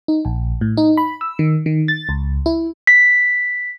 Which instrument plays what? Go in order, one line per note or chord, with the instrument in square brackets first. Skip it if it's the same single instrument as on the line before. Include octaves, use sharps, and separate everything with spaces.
[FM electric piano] D#4
A#1
A2
D#4
B5
E6
D#3
D#3
A6
C#2
E4
[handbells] B6